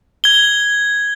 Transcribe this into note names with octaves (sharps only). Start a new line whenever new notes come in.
G#6 G7